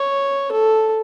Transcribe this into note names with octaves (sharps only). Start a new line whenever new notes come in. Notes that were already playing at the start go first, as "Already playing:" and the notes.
Already playing: C#5
A4